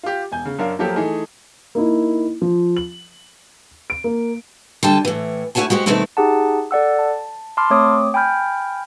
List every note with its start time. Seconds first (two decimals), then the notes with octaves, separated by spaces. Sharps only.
0.03 F4 G4
0.32 E1 G#5 G6
0.45 C#3
0.59 F#2 C#4 D4 A#4 F5
0.79 F3 F#3 A#3 G4 A4 A#4
0.96 E3 A3 D#4 G#4
1.75 A#3 D#4 E4
2.42 F3
2.77 F#7
3.90 D7
4.04 A#3
4.83 D3 G3 G5 A5
5.05 A2 E3
5.55 A3 E4 F#4 C#5 G#5 A5
5.70 G#3 F#4 G4 C5
5.86 B2 D#3 G3 A3 C4 E4
6.17 D#4 G4 G#4 F#5 A5
6.71 A4 D5 F#5 E6
6.99 A5
7.57 A5 B5 C6 D6 F6
7.70 A3 C4 C#5 D6 D#6
8.14 G5 G#5 B5 F6 G6